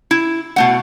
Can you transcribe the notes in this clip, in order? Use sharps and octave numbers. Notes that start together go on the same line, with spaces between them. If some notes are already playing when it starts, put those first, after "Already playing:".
E4
B2 A3 F#5